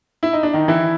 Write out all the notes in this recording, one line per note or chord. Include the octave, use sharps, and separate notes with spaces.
E4
D#4
D4
D#3 D#4
E3 E4